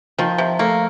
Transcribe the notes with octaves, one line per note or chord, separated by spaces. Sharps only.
D#3 F3
C3
A3 A#3